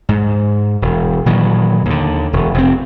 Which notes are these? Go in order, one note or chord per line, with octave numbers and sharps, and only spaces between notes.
G#2
E1
A#2 D#3 E3 F#3
D#2 D3
E1
F1 C4